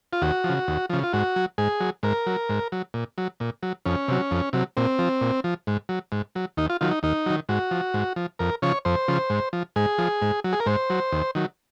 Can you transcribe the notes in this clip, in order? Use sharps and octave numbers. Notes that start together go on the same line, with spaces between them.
F4
D#2 F#4
F3
C#3
D#2
C#3 F3
F4
G#2 F#4
F#3
G#2 G#4
F#3
G#2 A#4
F#3
G#2
F#3
A#2
F#3
A#2
F#3
F2 C#4
C3 F#3
F2
C3 F#3
A#2 C4
F3
A#2
F3
G#2
F#3
G#2
F#3
D#2 D#4
F4
D#3 F#3 F4
D#4
D#2 D#4
D#3 F#3
G#2 F#4
F3
G#2
F3
F2 A#4
C#3 F3 C#5
F2 C5
C#3 F3
G#2
F3
G#2 G#4
F3
G#2
F#3
G#4
A#4
G#2 C5
F#3
D#2
D#3 F#3